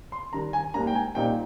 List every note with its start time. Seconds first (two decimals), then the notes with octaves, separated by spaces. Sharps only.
0.12 C6
0.33 D#3 G3 D4 A#5
0.53 G#5
0.74 G#2 G3 A#3 D4 A#5
0.87 G5
0.95 G#5
1.15 A#2 G3 C4 D#4 G5